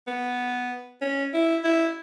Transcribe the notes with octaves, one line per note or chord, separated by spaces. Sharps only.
B3
C#4
E4
E4